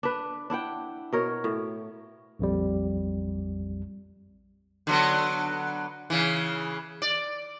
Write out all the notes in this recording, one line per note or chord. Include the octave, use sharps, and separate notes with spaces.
D4 B4
D4 E4 F#5 G5
B2 A#4 C#5
A2
A#1 F2 G3
D3 F#3 B3
C#3 E3
D5